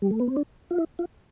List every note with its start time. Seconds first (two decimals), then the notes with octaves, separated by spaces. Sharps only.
0.02 G3
0.11 A3
0.20 B3
0.28 C4
0.36 D4
0.71 F4
0.78 E4
0.99 F4